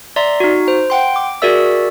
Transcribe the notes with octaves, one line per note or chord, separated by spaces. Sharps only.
D5 E5 A#5 C6
D#4 F#4
C5
F#5 G5 C6
D6
F#4 G#4 A#4 D5 E5 E6